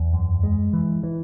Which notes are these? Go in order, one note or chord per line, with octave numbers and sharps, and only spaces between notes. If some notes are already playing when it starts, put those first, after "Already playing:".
Already playing: E2
F#2
G#3
E3
E3